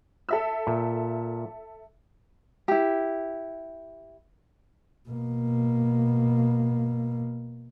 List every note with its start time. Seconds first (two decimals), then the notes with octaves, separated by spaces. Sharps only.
0.29 A4 E5 E6
0.67 A#2
2.68 E4 G4
5.09 B2 A#3